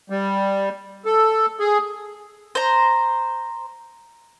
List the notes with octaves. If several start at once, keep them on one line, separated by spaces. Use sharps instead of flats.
G3
A4
G#4
C5 A#5